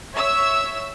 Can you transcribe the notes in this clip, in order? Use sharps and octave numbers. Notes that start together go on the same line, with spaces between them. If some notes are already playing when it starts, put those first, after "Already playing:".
C#5 E5 E6